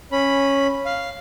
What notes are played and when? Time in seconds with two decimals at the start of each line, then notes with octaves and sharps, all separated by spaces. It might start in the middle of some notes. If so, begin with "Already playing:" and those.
0.12 C#4 B5
0.86 F5